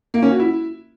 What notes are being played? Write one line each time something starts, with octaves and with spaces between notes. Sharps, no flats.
A#3
C#4
F#4
E4